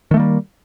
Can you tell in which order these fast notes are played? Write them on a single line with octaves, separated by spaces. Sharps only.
D#3 A3 A#3 G3